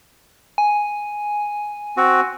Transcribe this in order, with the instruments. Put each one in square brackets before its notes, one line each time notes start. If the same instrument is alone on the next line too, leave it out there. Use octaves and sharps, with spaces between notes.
[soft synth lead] G#5
[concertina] C4 F#4